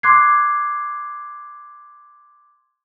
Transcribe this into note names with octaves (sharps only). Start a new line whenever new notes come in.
C6 D6 F#6 G#6 C7